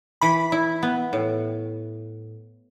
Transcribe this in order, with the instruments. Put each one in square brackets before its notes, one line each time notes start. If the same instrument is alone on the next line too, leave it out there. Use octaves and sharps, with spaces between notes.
[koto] E3 [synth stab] B5
[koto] E4
B3
A2